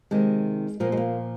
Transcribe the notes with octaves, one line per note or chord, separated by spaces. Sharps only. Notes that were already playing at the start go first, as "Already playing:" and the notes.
C3 D#3 G#3
A#2 F3 A#3
G#3
A#3